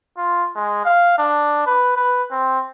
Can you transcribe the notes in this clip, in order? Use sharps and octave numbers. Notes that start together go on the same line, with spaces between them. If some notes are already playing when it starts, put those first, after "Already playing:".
F4
G#3
F5
D4
B4
B4
C4